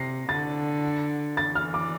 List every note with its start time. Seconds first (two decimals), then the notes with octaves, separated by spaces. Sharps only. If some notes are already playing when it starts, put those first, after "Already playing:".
Already playing: C3 A#6 C7
0.29 D3 A6
1.37 E3 A6
1.55 F6
1.74 D6